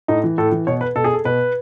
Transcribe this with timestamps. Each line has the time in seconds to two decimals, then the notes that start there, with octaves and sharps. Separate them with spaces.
0.08 A2 D#4
0.24 E3
0.38 A2 A4
0.52 E3
0.67 B2 C#5
0.81 B4
0.96 B2 A4
1.04 G#4
1.13 A4
1.25 B2 B4